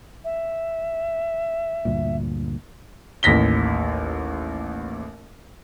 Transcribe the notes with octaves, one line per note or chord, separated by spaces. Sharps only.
E5
D2 G2 A#2
A1 D#2 A#6 B6 G7